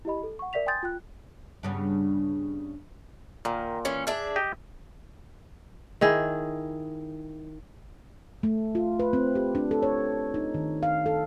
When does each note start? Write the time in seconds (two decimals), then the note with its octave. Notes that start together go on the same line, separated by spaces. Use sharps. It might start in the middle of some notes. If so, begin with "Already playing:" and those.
0.05 E4 G4 D#5 B5
0.23 A4
0.39 F#5 C#6
0.53 A#4 D5 E5 B6 F7
0.66 G5 G#5 C6 D#6 G6 A6
0.83 F4 G5 F#6
1.63 G2 C#3 B3
3.45 A#2 D#3
3.85 E3 C#4
4.07 D4 G#4 E5
4.36 G4 D#5
6.01 D#3 E4 G#4
8.43 A3
8.75 F4
8.99 B4
9.13 C4
9.35 G4
9.55 D4
9.71 A4
9.83 C#5
10.34 D#4
10.54 D#3
10.83 F5
11.06 A4